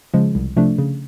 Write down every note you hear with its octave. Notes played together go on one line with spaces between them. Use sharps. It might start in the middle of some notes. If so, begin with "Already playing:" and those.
C#3 F3 G#3
C2
C3 F3 A3 D4
C#3